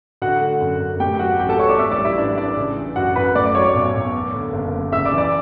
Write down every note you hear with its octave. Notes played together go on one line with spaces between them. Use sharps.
D3 F#4 F#5
A3
F#2
F#2
A2 G4 G5
F#3 F#4 F#5
A1 G4 G5
A4 A5
A1 C#5 C#6
D5 D6
A2 E5 E6
D5 D6
G3
E4 E5
A1 D4 D5
A1 D4 D5
C#3
E3
F#2 F#4 F#5
F#2 B4 B5
A2 D5 D6
D5 D6
F#3 C#5 C#6
D5 D6
B1
B1
E2
D3
F#1
F#1
C#3 E5 E6
D5 D6
E3
D5 D6